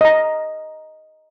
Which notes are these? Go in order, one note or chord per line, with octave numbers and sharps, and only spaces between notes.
D#5 A#5